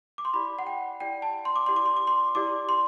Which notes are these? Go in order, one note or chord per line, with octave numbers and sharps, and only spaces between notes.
D6
C6
E4 G4 D5 B5
F#5
G5
E4 G4 D5 G5
A5
C6
D6
E4 G4 D5 C6
D6
C6
D6
C6
E4 G4 D5 D6
C6